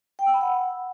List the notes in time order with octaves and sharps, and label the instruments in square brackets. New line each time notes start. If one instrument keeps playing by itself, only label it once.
[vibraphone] G5
E6
B5
F#5